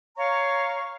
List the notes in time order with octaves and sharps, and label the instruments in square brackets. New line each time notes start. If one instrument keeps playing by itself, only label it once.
[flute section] C#5 F5 A#5 C#6